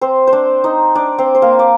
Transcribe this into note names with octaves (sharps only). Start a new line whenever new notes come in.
C4 C5
C5
D4 D5
D#4 D#5
D4 D5
C4 C5
C5
A#3 A#4
D5